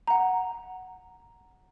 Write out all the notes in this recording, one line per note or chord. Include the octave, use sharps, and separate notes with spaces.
F#5 A#5